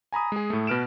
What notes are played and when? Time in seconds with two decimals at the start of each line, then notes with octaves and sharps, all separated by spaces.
0.12 G#5 A#5 B5 D#6
0.32 G#3 G#4
0.50 A2 A3
0.67 B2 B4 F6 D7 E7